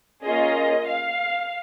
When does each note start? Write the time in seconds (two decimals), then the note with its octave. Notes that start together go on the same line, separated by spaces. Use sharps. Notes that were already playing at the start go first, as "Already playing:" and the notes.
0.24 A#3 C#4 F4 G#4 D#5
0.86 F5